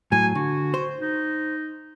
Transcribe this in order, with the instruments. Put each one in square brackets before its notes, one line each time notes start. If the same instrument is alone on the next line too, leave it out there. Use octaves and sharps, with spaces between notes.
[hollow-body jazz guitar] A2 F#3 [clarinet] G#5
[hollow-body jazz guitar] D3 [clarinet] F#4
[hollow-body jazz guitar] C5
[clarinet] D#4